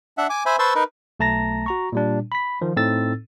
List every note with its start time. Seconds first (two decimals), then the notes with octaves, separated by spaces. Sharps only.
0.18 D4 E5 F#5
0.30 G#5 D6
0.46 C5 E5 G#5 B5
0.59 B4 C5 A5 C6 C#6 E6
0.75 D#4 A#4 B4
1.20 B1 A3 A5 A#5 A#6
1.66 F#4 A#5 C#6
1.92 A#2 G3 D4
2.32 B5 B6
2.61 D#3 F3
2.76 A2 C4 D#4 A4 E6 A6